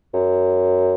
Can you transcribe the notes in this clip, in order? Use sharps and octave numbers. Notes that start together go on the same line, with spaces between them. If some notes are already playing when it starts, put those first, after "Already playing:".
F#2